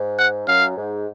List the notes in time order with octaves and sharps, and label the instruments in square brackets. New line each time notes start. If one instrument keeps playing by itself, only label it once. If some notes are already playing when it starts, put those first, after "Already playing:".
Already playing: [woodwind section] G#2
[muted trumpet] F#5
[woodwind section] F#2 [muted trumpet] F5
[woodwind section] G#2